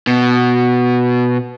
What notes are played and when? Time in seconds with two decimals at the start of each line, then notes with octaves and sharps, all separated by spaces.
0.07 B2